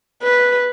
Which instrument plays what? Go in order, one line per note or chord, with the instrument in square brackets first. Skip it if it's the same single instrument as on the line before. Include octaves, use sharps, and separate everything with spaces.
[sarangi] B4